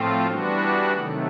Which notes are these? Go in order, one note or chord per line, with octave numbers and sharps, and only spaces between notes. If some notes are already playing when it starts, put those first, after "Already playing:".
Already playing: A2 F3 A3 C4 F4
E3 G3 B3 D4 F#4
C3 D#3 F#3 A3